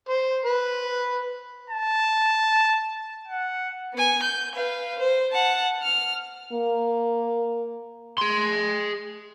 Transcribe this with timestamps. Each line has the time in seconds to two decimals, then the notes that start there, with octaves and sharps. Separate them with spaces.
0.09 C5
0.46 B4
1.70 A5
3.28 F#5
3.94 B3 G#5
4.23 G6
4.55 B4 F5
4.99 C5
5.31 F#5 A5
5.83 F6
6.52 A#3
8.18 G#4 C6